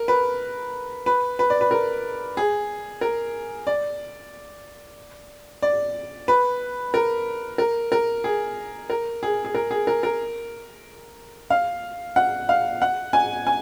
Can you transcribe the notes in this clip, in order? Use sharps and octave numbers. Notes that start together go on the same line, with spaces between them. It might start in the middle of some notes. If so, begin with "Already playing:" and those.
Already playing: A#4
B4
B4
B4
D5
B4
A#4
G#4
A#4
D5
D5
B4
A#4
A#4
A#4
G#4
A#4
G#4
G#4
A#4
G#4
A#4
A#4
F5
F#5
F5
F#5
G#5
G#5